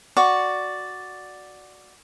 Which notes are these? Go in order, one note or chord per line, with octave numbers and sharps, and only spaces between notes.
F#4 D5 C#6